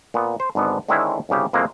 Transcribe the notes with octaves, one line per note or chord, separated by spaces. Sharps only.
A#2 B3
C5
G#1 G#2 D3 B3
D3 D#3 G#3 C4 C#4 E4
G1 C2 C#3 G4
F2 E3 G#3 A#3 C4